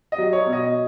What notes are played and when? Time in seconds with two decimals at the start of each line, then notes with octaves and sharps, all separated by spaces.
0.12 D#5
0.18 F#3
0.33 C#5
0.46 B2
0.53 D#5